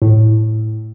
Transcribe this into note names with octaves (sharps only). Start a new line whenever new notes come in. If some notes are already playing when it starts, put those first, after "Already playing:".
A2